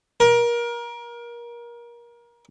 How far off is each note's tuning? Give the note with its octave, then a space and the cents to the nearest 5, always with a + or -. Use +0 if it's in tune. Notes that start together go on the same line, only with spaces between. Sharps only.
A#4 +25